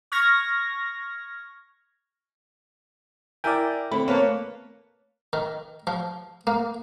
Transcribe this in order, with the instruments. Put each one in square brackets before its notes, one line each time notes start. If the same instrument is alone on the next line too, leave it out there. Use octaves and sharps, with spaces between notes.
[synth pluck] C#6 F6 G#6 A#6
[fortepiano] E4 A#4 G#5 [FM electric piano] D5 G5
[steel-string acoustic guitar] D3 [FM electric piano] A3 C4 [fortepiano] B5
[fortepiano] A#3 B4 A5 [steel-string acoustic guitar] C#5
[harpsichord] D#3
F3
A#3